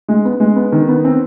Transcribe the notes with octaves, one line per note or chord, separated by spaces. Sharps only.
G#3
B3
G#3
B3
D#3
B3
C4